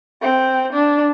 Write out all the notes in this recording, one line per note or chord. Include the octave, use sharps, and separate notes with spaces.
C4
D4